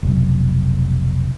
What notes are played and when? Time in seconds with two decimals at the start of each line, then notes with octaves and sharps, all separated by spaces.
0.03 F1 B1